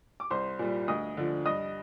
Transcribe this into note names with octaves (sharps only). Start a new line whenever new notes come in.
D6
C2 C5 C6
A#2 G3
D2 D#5 D#6
D3 F3
G2 D#5 D#6